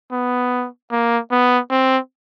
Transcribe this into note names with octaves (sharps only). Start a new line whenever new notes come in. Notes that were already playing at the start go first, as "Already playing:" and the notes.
B3
A#3
B3
C4